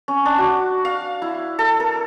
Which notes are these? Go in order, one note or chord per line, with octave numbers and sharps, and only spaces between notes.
C#4
D4
F#4
F5
E4
A4
A#4